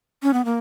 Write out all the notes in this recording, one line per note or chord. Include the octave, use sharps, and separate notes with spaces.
C#4
B3
A#3